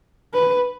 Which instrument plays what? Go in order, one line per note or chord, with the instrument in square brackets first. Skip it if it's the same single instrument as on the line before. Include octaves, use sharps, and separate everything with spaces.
[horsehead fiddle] B4